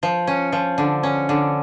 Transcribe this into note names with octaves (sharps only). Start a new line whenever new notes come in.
F3
C#4
F3
D3
C#4
D3